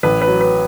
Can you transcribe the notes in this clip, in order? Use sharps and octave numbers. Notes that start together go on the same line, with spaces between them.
A1 B4
B4
F#3
B4